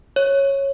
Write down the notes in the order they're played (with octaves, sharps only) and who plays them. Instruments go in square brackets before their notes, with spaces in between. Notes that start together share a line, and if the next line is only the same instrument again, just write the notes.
[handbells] C#5